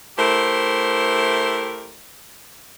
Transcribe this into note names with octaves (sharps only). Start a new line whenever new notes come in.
A3 E4 G4 A#4 C5